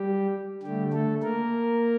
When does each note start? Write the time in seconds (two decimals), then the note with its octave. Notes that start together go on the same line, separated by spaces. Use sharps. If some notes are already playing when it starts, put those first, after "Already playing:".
Already playing: G3 G4
0.63 D3 G3 A3 G4
0.93 A3 A4
1.23 A#3 A#4